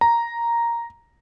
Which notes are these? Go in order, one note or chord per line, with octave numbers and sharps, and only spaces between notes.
A#5